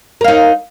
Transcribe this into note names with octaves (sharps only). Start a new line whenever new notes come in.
D#4 A#4 F5